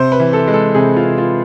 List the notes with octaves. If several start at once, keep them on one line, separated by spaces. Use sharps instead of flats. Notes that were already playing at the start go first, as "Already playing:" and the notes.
Already playing: C3 C5
B4
E3
A4
G#3
A4
C3 G#4
F4
C3
F4